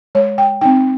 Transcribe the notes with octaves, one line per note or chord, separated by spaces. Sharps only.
G#3 C#5
G5
C4 D#4 G5